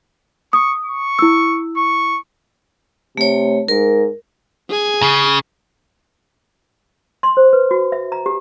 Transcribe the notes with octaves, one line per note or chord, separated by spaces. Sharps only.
C#6 D#6
C#6
E4 E6
C#6
C3 A3 C#5
G#2 A#4
G#4 G#5
C#3
C6
C5
B4
F#4
E5
A#5
G4